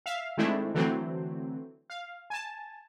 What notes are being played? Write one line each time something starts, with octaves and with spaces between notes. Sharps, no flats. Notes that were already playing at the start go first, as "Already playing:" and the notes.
E5 F5
D#3 G#3 A3 C4 D4 E4
D3 E3 F#3 A3 C4
F5
G#5 A5